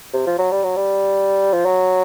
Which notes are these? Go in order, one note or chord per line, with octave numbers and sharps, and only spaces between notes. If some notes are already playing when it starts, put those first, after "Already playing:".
C3
F3
F#3
G3
F#3
G3
F3
F#3